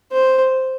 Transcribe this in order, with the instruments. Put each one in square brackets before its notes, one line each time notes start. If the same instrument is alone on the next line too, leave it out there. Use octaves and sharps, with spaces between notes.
[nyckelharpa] C5